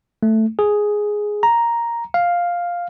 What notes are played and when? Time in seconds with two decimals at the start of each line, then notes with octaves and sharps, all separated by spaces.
0.23 A3
0.59 G#4
1.43 A#5
2.14 F5